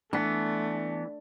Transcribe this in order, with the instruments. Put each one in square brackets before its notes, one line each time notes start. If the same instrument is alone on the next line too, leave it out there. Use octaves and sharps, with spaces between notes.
[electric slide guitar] E3 B3 [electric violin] A3 [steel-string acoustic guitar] D4